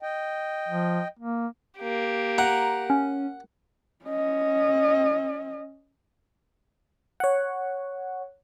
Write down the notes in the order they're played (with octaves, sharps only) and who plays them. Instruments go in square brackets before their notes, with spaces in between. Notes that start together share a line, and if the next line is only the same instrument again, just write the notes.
[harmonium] D#5 G5
[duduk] F3
A#3
[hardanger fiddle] A#3 G4
[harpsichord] F#5 [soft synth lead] A#5
[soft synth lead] C#4
[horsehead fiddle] C#4 D#5
[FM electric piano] C#5 F#5